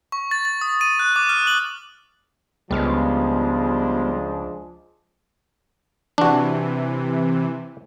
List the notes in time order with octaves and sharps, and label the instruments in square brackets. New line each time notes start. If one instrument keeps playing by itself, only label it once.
[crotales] C#6
A6
A6
D#6
D#7
F#6
D6
F6
F#7
[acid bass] C#2 [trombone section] F3 G#3 D4 [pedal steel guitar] G3 B3 F5
[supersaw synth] C3 E3 [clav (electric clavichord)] D4 F#4